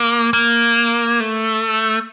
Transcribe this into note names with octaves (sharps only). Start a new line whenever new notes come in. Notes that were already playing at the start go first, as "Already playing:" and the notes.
Already playing: A#3
A#3
A3